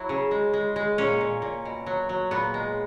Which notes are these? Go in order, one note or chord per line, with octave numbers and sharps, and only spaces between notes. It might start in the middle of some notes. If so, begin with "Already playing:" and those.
Already playing: F#3 E4
C#3
G#3
G#3
G#3
A#2 C#4
A#2
A#2
B2
F#3
F#3
A#2 B3
G#3